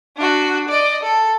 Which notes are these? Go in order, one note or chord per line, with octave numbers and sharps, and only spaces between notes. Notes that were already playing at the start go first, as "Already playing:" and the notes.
D4 F#4
D5 D#5
A4